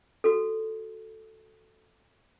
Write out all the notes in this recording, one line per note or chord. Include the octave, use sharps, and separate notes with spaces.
F#4 A4